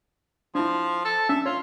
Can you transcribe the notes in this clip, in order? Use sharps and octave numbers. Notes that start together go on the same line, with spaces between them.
F3 D4 E4
A4
C#4 D4 E5
F4 C#5